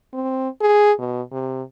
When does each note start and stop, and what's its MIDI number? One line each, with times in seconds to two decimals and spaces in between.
0.14 0.49 60
0.61 0.92 68
0.99 1.22 47
1.32 1.62 48